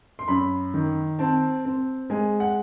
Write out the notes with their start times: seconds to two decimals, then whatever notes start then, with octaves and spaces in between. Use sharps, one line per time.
0.19 C6
0.28 F#2 B5
0.74 D#3
1.19 C4 A5
1.65 C4
2.10 G#3 G#5
2.40 F#5